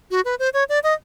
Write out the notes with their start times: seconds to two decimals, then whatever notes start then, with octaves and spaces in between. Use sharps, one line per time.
0.11 F#4
0.25 B4
0.39 C5
0.54 C#5
0.69 D5
0.83 D#5